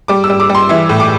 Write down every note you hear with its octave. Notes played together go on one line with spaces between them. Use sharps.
G3 D6
E6
G3
D6
G3
C6
E3 E5
A2
D6